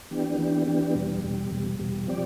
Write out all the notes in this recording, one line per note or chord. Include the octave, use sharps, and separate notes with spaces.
E3 B3 D4 G4
E3 B3 D4 G4
E3 B3 D4 G4
E2 B2 G3
E2 B2 G3
E2 B2 G3
E2 B2 G3
F3 C4 G4 D5